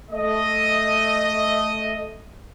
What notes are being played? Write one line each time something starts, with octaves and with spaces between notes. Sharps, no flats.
A3 D#5